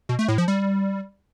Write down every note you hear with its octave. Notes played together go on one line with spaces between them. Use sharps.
B2
A3
A2
F3
G3